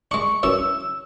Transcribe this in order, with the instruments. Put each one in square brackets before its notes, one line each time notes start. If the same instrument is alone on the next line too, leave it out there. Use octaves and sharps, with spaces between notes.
[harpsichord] G#3 D4 [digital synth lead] C#6
[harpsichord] F#2 E3 C#4 [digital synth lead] E6